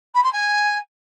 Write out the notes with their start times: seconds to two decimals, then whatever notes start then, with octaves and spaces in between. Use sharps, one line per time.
0.14 B5
0.23 C6
0.32 G#5